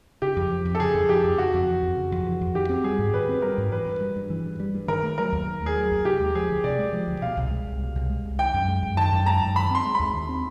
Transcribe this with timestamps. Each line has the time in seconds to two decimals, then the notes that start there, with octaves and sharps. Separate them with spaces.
0.22 C#3 G4
0.36 F2
0.51 F3
0.65 F2
0.75 A4
0.80 C#3 G#4
0.94 F2
1.09 F3 G4
1.23 F2
1.38 C#3 F#4
1.53 F2
1.68 E3
1.82 F2
1.97 C#3
2.12 F2
2.26 E3
2.41 F2
2.55 D#3 G4
2.69 C4
2.84 G3 G#4
2.98 G#2
3.13 D#3 B4
3.29 C4
3.42 G3 A#4
3.58 G#2
3.72 E3 B4
3.87 G2
4.01 G3
4.16 G2
4.30 E3
4.45 G2
4.60 G3
4.74 G2
4.88 D#3 A#4
5.03 A3
5.18 F#3 A#4
5.32 D#2
5.47 D#3
5.62 A3 G#4
5.76 F#3
5.91 D#2
6.05 C3 G4
6.20 G#3
6.35 F3 G#4
6.50 D2
6.64 C3 D5
6.78 G#3
6.93 F3
7.07 D2
7.22 B2 F5
7.37 C2
7.51 G#3
7.66 C2
7.81 B2
7.95 C2
8.10 G#3
8.25 C2
8.39 D#3 G5
8.54 F#2
8.68 G#3
8.82 F#2
8.97 D#3 A5
9.12 F#2
9.26 G#3 A#5
9.41 F#2
9.56 D#3 B5
9.71 C4 C6
9.85 G#3
9.95 D#2 B5
10.14 D#3
10.29 C4